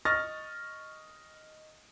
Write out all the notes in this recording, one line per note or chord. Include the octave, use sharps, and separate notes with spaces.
D#5 C#6 D#6 F6 A6 A#6